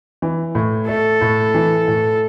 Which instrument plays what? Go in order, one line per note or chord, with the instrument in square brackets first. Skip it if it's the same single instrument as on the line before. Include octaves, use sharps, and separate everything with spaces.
[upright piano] E3
A2
[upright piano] A3 [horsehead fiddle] A4
[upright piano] A2
E3
A2